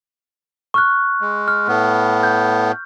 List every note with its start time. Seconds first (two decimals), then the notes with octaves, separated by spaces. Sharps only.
0.74 C#6 F6 F#6
1.21 G#3
1.48 F6
1.68 A2 B3
2.23 G6